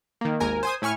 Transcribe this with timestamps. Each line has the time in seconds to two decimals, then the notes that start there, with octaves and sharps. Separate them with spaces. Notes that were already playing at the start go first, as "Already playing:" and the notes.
0.21 D#3 A#3
0.40 G#1 D#2 A#4 G#5
0.63 C5 G#5 D#6
0.82 A2 E4 G#5 C#6 F6